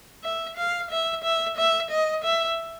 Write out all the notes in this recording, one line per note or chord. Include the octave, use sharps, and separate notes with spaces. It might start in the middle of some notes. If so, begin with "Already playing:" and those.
E5
F5
E5
E5
E5
D#5
E5